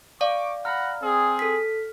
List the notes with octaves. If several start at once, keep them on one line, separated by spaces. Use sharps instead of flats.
D5 F5 C#6 D6
F#5 A#5 B5 F6
C4 G#4
A4 B6